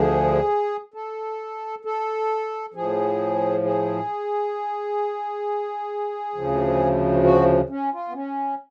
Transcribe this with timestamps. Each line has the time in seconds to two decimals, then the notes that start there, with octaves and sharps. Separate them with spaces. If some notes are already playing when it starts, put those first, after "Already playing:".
Already playing: D2 D3 F3 G#4
0.94 A4
1.85 A4
2.74 A2 F3 G#4
3.64 G#4
6.34 D2 C#3 F3
7.24 F#4
7.69 C#4
7.93 F4
8.08 B3
8.14 C#4